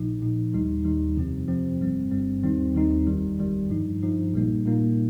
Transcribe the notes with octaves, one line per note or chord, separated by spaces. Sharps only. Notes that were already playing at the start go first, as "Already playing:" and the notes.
Already playing: A#1 A#2 F3 D#4
A#1 A#2 F3 D#4
D#2 D#3 G3 D#4
D#2 D#3 G3 D#4
F2 C3 F3 C4
F2 C3 F3 C4
G1 G2 G3 C4
G1 G2 G3 C4
D#2 D#3 G3 C4 D#4
D#2 D#3 G3 C4 D#4
G1 F2 D#3 G3
G1 F2 D#3 G3
G2 F3 D#4
G2 F3 D#4
A#1 A#2 G3 A#3 D#4
A#1 A#2 G3 A#3 D#4